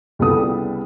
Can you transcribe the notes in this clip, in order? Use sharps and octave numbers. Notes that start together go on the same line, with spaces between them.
C2 C#3 G3 B3 A4 D#6